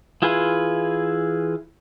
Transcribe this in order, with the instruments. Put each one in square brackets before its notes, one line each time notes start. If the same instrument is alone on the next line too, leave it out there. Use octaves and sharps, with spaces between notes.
[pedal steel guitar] E3 E4 F4 G#4 B4